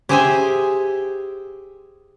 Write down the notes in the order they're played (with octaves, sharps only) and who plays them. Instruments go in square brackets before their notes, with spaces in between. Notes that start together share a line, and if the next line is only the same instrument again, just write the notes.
[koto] G4 G#4 C5 E5 G5 G#5